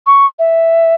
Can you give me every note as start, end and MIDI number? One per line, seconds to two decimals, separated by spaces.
0.07 0.26 85
0.39 0.94 76